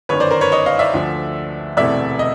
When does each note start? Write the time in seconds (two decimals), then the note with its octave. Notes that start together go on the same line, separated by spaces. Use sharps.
0.09 G1 F#2 D#3 B4 C#5
0.20 C5 D5
0.31 A#4 C5
0.41 B4 C#5
0.52 C#5 D#5
0.66 D#5 F5
0.79 D5 E5
0.94 D2 D3 F3
1.77 E1 D2 C3 E3 A3 D5 E5
2.19 D#5